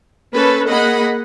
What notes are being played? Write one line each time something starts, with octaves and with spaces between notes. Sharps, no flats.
A#3 C#4 A4 B4
A#3 G#4 D#5 F#5 B5